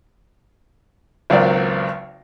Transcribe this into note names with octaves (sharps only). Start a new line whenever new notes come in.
G#1 C#2 F#3 A#3 C4 D5